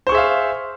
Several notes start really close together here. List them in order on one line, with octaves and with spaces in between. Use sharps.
C5 C#6 G#4 E5 F5